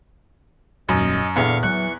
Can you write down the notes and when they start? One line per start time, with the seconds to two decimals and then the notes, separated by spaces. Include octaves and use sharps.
0.89 D#1 F#2 D#5
1.36 E2 A#2 D3 F5 C#6
1.63 E3 F#3 C#6 F#6